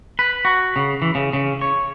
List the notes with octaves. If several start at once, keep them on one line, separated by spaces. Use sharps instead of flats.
B4
F#4
C#3
E3
C#3
C#3
C#5